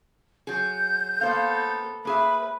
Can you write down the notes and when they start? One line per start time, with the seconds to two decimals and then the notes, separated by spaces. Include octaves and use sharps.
0.47 F#3 G#4 G6
1.21 A#3 B3 A4 C5 F5
2.05 A#3 G#4 B4 E5 B5